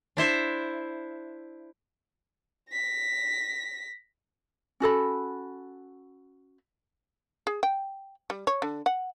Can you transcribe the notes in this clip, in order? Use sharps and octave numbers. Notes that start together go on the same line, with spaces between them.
D4 E4 C5 E5
A#6 B6
C#4 F#4 A4 B5
G#4
G5
G3
C#5
D3
F#5